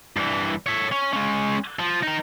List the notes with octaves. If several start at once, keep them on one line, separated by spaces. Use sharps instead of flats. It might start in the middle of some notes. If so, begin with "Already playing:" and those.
G2 E3
C#5 E5
C#4
G#3 C#4
F3
D#4 A#4